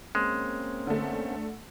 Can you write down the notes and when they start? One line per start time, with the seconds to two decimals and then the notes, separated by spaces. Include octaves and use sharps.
0.15 G#3 A#3 C4 C#4
0.87 D3 A3